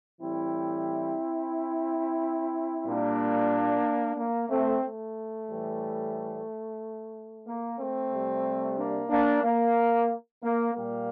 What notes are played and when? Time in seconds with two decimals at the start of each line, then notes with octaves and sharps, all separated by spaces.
0.20 A2 E3 G3 C4 E4
2.84 A#2 G3 A#3 D4
4.16 A#3
4.49 A3 C4
4.81 A3
5.48 A2 E3 G3
7.46 A#3
7.78 A3 C4
8.11 C3 G3
8.77 A#3 D4
9.10 A#3 D4
9.43 A#3
10.42 A#3
10.74 A#2 G3 A#3